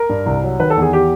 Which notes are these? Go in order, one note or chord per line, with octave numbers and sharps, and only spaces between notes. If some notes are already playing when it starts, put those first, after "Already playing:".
Already playing: A#4
G2
C2
F#3
D#3 B4
A4
E2
G#4
G4